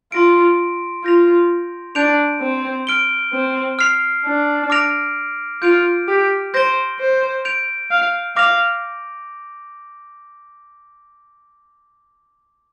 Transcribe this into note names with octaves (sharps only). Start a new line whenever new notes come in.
F4 C6 A#6 D7
F4 G6 A#6 F7
D4 G6 D7 F7
C4
F6 D7 G7
C4
F6 C7 F7
D4
D6 F6 A#6 D7 F7
F4 G6 D7 F7
G4
C5 G6 A#6 D7 G7
C5
G6 D7 F7
F5
F5 D6 A#6 F7